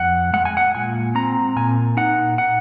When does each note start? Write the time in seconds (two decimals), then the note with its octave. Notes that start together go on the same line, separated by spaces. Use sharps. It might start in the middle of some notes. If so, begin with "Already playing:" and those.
Already playing: F2 F#5
0.33 G#3 F#5
0.45 G#5
0.57 F#5
0.75 A#2 G#5
1.15 C4 A#5
1.56 A#2 G#5
1.97 D#4 F#5
2.38 F#5